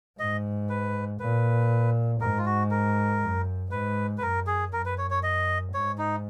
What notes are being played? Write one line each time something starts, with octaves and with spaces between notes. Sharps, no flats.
G#2 D#5
B4
A#2 B4
G#2 A#4
F4
F#4
A#4
F#2
G#2 B4
B4
F#2 A#4
G#4
F#2 A#4
B4
C#5
C#5
D#5
G#2 C#5
D#4